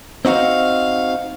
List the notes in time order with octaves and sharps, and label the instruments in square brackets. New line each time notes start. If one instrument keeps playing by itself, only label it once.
[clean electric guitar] C4 D#4 F#4 [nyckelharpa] F5